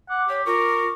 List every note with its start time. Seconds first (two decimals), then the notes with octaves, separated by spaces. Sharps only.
0.09 F#5 D6
0.29 G4 C#5
0.46 F4 A#4 C#6